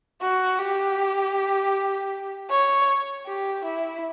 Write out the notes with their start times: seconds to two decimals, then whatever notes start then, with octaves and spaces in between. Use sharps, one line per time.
0.21 F#4
0.59 G4
2.50 C#5
3.27 G4
3.65 E4